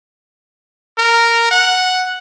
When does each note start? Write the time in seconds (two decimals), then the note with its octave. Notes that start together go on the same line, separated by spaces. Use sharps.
0.98 A#4
1.51 F#5